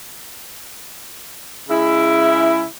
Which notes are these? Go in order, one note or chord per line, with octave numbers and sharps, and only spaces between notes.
C#3 G#3 E4